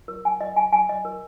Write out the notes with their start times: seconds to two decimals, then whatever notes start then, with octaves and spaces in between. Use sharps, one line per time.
0.08 A#4
0.25 G#5
0.41 D#5
0.57 G#5
0.73 G#5
0.89 D#5
1.05 A#4